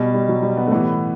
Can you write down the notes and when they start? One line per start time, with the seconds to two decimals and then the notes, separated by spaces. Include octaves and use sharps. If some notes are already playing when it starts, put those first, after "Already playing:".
Already playing: B2 G3
0.14 G3
0.29 F#3
0.43 G3
0.57 B3
0.67 A3
0.71 A2 E3 B3